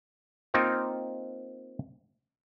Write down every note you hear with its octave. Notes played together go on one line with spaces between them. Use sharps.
A#3 C4 D#4 F4 A#4